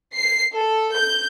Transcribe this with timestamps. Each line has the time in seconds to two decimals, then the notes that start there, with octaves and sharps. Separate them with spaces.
0.13 C7
0.55 A4
0.96 G6